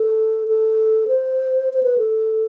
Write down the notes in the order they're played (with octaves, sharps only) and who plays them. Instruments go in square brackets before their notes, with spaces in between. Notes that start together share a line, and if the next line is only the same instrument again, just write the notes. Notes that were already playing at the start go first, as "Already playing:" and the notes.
Already playing: [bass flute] A4
A4
C5
C5
B4
A4